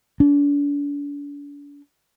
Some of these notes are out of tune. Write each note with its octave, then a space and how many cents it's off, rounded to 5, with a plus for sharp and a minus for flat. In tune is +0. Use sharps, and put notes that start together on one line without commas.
D4 -40